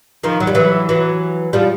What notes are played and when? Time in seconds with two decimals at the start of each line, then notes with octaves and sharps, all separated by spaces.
0.23 D#3 F3
0.40 F#3
0.47 G3
0.55 E3 F#3
0.89 E3 F#3
1.53 F3 G3